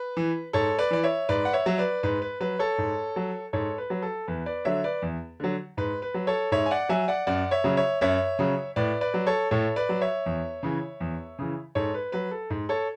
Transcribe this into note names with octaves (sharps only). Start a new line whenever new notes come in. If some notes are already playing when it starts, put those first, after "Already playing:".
Already playing: B4
E3
G#2 A4 C#5
B4 D5
E3 D5
C#5 E5
G#2 B4 D5
F#5
C#5 E5
F#3
B4 D5
G#2 B4
B4
F#3 B4
A4 C#5
G#2
F#3
G#2 A4 C#5
B4
F#3
A4
E2 B4
B4 D5
D3 F#3 C#5 E5
B4 D5
E2
D3 F#3
G#2 B4
B4
F#3
A4 C#5
G#2 C#5 E5
G#5
D5 F#5
F#3 E5 G#5
D5 F#5
F#2 D5 F#5
C#5 E5
C#3 F#3
C#5 E5
F#2 C#5 E5
C#3 F#3
A2 B4 D5
B4 D5
F#3
A4 C#5
A2 A4 C#5
B4 D5
F#3
C#5 E5
E2
C#3 E3
E2
C#3 E3
G#2 A4 C#5
B4
F#3 B4
A4
G#2
A4 C#5